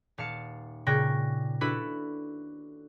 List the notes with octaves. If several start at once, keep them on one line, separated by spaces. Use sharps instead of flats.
D#1 F5 A5 C#7
A#2 C#3 G5 C#6 F#6 A#6
D4 E4 F#4 A4 B4 B5